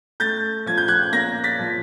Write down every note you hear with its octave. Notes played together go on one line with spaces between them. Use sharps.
A3 G6 A6
F3 G#6
G6
F#6 G#6
A#3 G#6 A#6
A6 B6
F3